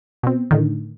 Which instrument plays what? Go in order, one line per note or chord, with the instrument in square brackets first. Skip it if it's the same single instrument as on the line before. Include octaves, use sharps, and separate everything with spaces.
[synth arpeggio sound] B2 C4
A2 D3 D#3